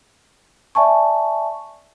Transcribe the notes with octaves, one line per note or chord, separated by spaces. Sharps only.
D5 E5 G#5 A5 C#6